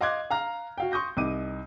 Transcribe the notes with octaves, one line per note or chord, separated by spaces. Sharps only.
D#5 F5 C6 D6 F#6 G#6
F5 A#5 F6
F#4 F5 G5
C6 C#6 D#6 G6 A#6
C2 D#4 D6 D#7